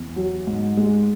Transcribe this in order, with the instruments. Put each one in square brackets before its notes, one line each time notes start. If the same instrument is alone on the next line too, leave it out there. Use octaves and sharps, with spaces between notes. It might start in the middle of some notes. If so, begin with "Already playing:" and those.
Already playing: [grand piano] E2
F#3
G#2
G#3